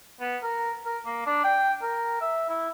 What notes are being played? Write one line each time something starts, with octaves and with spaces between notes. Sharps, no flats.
B3
A#4
A#4
A#3
D4
G5
A#4
E5
E4